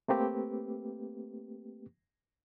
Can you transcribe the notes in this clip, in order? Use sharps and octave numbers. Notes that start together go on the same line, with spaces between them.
A3 A#3 C4 G4 B4